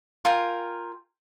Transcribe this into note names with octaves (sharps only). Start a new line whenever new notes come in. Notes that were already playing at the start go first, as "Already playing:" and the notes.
F4 A#4 G5 G#5